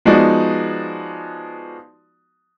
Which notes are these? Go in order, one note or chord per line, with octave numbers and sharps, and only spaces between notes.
F3 G#3 B3 D#4 F#4 D5